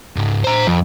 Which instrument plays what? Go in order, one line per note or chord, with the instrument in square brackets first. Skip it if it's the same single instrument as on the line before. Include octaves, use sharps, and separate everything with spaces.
[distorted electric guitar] C#2 G#2
C5 A#5
F2